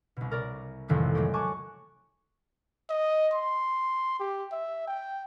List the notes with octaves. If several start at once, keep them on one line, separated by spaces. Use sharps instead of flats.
C2 B2
A#4 D5
A1 F2 C3 D#3 G3
F#3 G#3 A3 F#4 G4
G#5 A5 C#6 D6 F#6
D#5
C6
G4
E5
G5